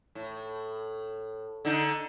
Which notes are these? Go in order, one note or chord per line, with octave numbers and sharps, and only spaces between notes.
A2
D3 D#4